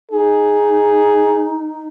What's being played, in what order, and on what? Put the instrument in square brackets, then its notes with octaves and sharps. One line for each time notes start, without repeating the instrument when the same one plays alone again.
[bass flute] D#4 [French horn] G#4